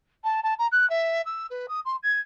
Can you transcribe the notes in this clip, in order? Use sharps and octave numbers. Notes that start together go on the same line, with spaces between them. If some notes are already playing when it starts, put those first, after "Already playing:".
A5
A5
A#5
F#6
E5
E6
B4
D#6
C6
G#6